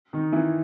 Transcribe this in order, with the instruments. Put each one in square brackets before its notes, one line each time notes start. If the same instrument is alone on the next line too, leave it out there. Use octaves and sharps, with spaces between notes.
[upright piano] D#3 D#4
E3 E4